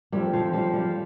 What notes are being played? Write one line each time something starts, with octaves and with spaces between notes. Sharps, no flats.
F2 G3
F3
F3 G3
G3